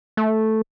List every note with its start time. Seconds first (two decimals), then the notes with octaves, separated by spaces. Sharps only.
0.17 A3